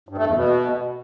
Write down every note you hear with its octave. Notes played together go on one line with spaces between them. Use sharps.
G2
A3
E2
B2